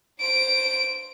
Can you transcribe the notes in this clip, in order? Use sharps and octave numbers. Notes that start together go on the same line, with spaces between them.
C5 D7